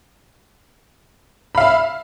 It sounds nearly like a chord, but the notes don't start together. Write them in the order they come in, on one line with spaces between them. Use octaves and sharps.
B5 F5 E5